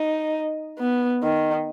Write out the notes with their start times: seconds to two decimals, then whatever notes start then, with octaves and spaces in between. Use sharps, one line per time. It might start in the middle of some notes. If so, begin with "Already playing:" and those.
Already playing: D#4
0.79 B3
1.23 D#3